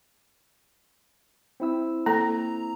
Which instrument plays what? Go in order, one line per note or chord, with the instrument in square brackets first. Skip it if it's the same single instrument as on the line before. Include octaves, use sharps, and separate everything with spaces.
[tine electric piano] C4 E4 E6
[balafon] A#3 A4 [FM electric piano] A#5